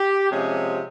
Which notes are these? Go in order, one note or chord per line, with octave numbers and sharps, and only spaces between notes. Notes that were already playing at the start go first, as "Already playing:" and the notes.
Already playing: G4
C3 F3 G#3 C#4 G#4